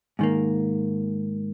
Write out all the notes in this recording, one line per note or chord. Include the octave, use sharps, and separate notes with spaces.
G#2 D#3 A#3